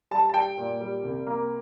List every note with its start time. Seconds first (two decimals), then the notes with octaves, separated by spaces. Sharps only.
0.11 G3 A5
0.29 A5
0.34 G3 G5
0.58 A#2
0.81 G3
1.03 C2
1.27 A#3